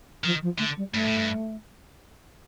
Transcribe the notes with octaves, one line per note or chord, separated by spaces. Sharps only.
D#3 F3
F3
D3 A3
G3
G2 A3
A2
G2